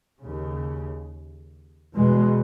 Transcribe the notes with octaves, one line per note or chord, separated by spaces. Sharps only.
D#2 C#3
E2 B2 G#3